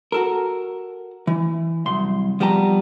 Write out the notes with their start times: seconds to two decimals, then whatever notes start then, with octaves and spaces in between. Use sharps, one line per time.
0.12 F#4 A4 A#4
1.27 E3
1.86 C2 F#2 C6
2.40 F3 G3 B3 G4 A5 A#5